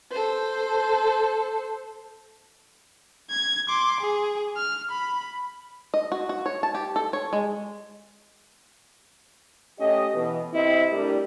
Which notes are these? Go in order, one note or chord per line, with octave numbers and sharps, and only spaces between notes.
A4 C5
G#6
C6 D6
G#4
F6
B5
D#5
F#4
F#4
C#5
A5
G4
A4
C#5
G#3
A3 C#4 G4 D#5
B2 E3 B3
C3 C4 E4 D#5
G3 A3 D4 E4 G4 A#4